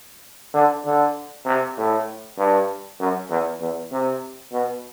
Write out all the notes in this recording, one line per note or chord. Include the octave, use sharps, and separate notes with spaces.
D3
D3
C3
A2
G2
F#2
E2
E2
C3
B2